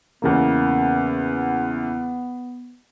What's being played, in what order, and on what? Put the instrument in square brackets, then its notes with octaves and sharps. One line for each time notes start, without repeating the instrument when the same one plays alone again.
[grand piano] E2 C#3 A#3 [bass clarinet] B3